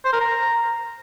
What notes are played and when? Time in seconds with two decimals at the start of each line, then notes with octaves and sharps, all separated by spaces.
0.05 C5
0.13 A#4
0.21 A#5